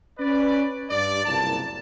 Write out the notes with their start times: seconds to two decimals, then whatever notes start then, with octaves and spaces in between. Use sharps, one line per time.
0.18 C#4 B4 D5
0.89 G2 D5
1.25 F#1 C2 A#2 A5